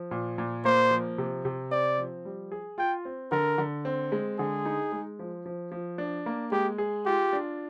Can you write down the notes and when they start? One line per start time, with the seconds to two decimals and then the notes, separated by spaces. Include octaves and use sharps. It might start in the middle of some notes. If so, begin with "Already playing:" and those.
Already playing: F3
0.11 A#2
0.38 A#2
0.65 A#3 C5
0.91 F3
1.18 C3
1.45 C3
1.71 C4 D5
1.98 F3
2.25 G3
2.52 G#4
2.78 F4 G5
3.05 C4
3.32 D3 A#4
3.58 D3
3.85 C4
4.12 G#3
4.39 D3 G#4
4.65 D#4
4.92 G#3
5.19 F3
5.46 F3
5.72 F3
5.98 D4
6.26 A#3
6.52 G#3 G4
6.78 G#4
7.06 F4 G4
7.33 D4